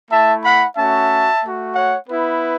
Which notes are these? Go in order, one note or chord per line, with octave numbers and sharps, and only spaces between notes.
A3 E4 E5 A5
F#5 B5
A3 C#4 F#4 E5 A5
A3 F#4
C#5 F#5
B3 E4 B4